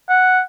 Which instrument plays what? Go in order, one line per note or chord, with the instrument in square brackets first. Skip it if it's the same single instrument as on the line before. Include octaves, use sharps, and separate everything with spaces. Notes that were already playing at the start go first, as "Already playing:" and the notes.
[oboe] F#5